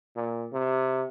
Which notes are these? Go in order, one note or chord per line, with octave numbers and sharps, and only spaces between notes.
A#2
C3